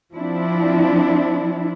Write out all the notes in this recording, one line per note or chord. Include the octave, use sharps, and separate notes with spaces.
F3 C4 D4 E4